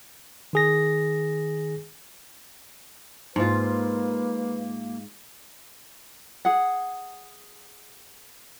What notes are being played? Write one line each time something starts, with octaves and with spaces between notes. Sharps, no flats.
D#3 G#4 A#6
G#2 A#3 F4 B4
G#4 F#5